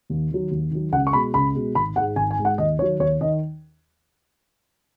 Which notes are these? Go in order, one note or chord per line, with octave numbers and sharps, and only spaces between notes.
D#2
D#3 F#3
D#2
D#3 F#3
C#2 F#5
C#6
B2 G#3 B5
C#2 B5
B2 G#3
G#1 B5
G#2 G#3 F#5
G#1 G#5
G#5
G#2 G#3
F#5
D#2 D#5
D#3 F#3 C#5
D#2 C#5
D#3 D#5